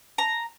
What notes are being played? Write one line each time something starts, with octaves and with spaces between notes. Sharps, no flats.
A#5